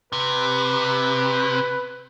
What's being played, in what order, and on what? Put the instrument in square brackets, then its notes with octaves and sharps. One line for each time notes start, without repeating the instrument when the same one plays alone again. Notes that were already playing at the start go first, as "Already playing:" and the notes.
[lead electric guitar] C3 [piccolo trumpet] B4